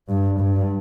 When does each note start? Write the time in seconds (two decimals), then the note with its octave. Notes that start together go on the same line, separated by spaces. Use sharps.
0.09 G2
0.40 G2